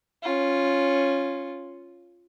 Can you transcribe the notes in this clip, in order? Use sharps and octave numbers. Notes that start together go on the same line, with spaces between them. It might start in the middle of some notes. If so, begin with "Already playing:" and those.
C#4 F4